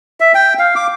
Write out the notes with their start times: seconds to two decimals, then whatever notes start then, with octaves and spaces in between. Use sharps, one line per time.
0.20 E5
0.35 G5
0.59 F5
0.76 D6